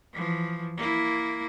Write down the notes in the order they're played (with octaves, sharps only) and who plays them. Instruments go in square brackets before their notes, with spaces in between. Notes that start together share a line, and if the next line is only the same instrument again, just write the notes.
[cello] E3 F3
A#3 E4